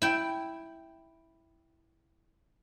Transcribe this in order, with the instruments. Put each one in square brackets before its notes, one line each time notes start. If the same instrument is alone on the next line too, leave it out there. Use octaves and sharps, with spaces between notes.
[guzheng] E4 G5